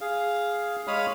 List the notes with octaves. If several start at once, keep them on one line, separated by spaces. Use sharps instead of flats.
G#4 F5
G#3 C#5 F5 B5 D#6 F6